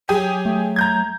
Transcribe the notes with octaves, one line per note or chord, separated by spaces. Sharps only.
F#3 G4 G#4 G#5
A3
A#5 G6 G#6